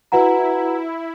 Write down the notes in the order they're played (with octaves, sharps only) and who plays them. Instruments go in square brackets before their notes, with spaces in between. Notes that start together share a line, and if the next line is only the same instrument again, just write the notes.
[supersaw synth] E4 [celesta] F#4 B4 F#5 A#5